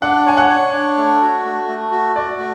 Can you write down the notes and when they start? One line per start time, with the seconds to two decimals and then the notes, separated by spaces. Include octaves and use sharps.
0.02 D4 F#5
0.26 C#5 G#5
0.37 F#5
0.50 C#5
0.73 D4
0.97 A3
1.21 F#4
1.45 A3
1.68 A3
1.92 F#4
2.16 F#4 D5
2.39 A3